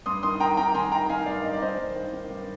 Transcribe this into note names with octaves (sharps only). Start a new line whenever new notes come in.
G2 C6 D#6
D#3 C6 D#6
D#3 G5 A#5
D#3 G5 A#5
D#3 G#5 C6
D#3 G5 A#5
D#3 F5 G#5
G2 D5 F5
G2 D#5
D5
D#3 C5 D#5
G2
D#3
D#3
G2